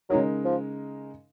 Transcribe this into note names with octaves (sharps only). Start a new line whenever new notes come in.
C#3 F#3 G#3 D#4 A#4
F3